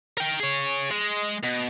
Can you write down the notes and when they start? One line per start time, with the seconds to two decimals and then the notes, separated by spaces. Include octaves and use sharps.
0.18 A#4 G5
0.39 G#4 C#5
0.91 G#3
1.44 B2